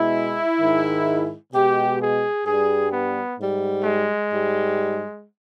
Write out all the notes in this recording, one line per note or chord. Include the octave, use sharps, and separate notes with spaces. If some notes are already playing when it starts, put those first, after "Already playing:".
Already playing: B2 G#3 E4
G#2 D#3 G#3
B2 G#3 G4
G#4
G2 G3 G#4
B3
G#2 G3
G#3
G#2 G3